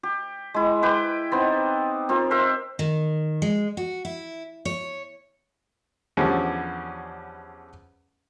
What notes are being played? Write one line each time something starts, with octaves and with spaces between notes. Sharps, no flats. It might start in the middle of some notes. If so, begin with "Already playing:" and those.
G4
G#3 E4
G4 B4 G5
B3 C4 D#4
C4 F4 A#4
A#4 C5 E5
D#3
G#3
F#4
E4
C#5
E2 D3 F3 G3 C#4